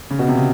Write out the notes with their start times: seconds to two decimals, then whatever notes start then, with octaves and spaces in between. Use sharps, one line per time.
0.10 C#3
0.19 B2
0.28 C3
0.37 C#3